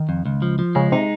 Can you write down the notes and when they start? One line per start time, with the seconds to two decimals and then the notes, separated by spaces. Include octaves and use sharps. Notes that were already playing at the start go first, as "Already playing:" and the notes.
Already playing: D#3
0.09 F2
0.25 C#2
0.42 F3
0.59 F3
0.75 C#3 G#3
0.92 C3 D#4